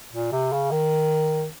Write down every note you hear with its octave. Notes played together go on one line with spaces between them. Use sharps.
A#2
C3
C#3
D#3